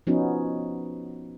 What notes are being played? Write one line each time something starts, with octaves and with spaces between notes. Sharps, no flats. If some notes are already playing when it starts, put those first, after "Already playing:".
F3 B3 C#4 D#4 F#4